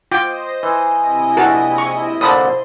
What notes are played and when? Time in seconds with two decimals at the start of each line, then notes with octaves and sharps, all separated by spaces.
0.11 F4 C5 D#5 G5 D6
0.63 E3 G#5
0.94 C3 E4 D#5
1.37 A#1 F#4 A#4 A5
1.78 C#6
2.21 A#2 D3 C5 A5 B5 C6 D#6